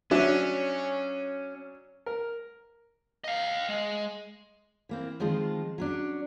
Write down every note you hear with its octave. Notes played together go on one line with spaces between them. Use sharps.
F#3 C#4 D4 E5
A#4
D#5 F5
G#3
E3 A#3 C4
D#3 F3 G#3 C4 F4
F#3 C#4 D4